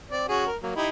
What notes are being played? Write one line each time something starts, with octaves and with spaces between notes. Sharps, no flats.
C4 D5
C#4 F#4 G#4
A#4
F#3 A#3
D#4 E4 G4